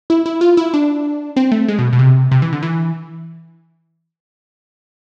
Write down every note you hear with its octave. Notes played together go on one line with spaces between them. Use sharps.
E4
E4
F4
E4
D4
C4
A3
G#3
B2
B2
C3
C3
E3
D3
E3